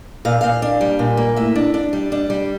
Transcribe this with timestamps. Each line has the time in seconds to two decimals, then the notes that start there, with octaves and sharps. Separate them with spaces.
0.25 A#2 F5
0.41 A#2 F5
0.62 D4
0.81 G3
0.99 A#2
1.17 A#3
1.36 A2 E5
1.55 D4
1.74 D4
1.93 G3
2.12 D4
2.30 G3